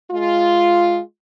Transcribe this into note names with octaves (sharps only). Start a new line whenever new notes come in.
G#3 F4